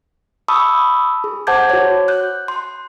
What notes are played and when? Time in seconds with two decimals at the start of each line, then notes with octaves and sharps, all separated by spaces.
0.48 A5 B5 C#6 D#6 E6
1.24 G#4
1.47 C5 F#5 A5 D6 G6 G#6
1.70 F#4 C#5
2.08 F#6 G6
2.48 C6